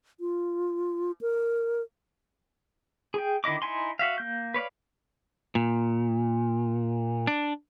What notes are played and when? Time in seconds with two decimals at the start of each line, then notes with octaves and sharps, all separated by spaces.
0.20 F4
1.21 A#4
3.14 G#4 G5
3.44 D3 D#3 E4 D#5 D6
3.62 D#4 E4 G#5 C6
3.99 F#4 E5 F5
4.18 A#3 G6
4.54 B4 C#5 D5 F5
5.55 A#2
7.27 D4